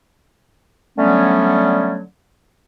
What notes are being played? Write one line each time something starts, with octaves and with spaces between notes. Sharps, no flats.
D3 F#3 G3 A3 B3 C#4